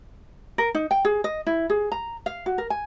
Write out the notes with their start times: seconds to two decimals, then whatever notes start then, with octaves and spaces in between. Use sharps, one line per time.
0.58 A#4
0.75 D#4
0.91 G5
1.05 G#4
1.24 D#5
1.47 E4
1.70 G#4
1.92 A#5
2.26 F5
2.46 F#4
2.58 A#4
2.70 G#5